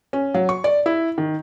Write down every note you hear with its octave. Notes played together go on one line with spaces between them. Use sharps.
C#4
F#3
C#6
D5
E4
D#3